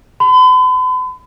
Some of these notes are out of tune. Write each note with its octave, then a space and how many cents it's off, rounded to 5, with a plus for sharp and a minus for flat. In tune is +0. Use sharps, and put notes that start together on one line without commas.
B5 +45